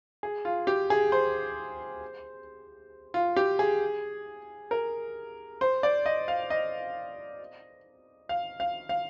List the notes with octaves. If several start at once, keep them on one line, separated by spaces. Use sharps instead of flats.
G#4
F4
G4
G#4
C5
F4
G4
G#4
A#4
C5
D5
D#5
F5
D#5
F5
F5
F5